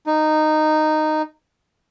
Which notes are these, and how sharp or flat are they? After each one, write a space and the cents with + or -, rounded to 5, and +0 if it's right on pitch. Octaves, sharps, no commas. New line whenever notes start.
D#4 -10